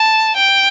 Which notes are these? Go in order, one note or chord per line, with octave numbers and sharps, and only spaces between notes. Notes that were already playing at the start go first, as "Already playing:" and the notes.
Already playing: A5
G5